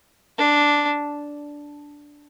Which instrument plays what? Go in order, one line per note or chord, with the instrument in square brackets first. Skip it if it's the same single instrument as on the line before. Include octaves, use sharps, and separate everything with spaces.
[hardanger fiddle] D4